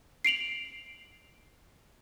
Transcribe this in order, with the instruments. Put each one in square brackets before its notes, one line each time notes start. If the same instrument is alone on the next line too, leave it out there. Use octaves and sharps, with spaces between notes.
[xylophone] C7 D7 F7 F#7